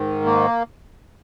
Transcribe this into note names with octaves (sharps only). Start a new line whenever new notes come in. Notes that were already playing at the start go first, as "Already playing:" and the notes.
Already playing: G#2 D#3
A#3